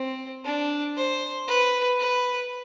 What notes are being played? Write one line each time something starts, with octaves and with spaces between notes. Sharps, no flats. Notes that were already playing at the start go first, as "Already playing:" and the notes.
Already playing: C4
D4
C5
B4
B4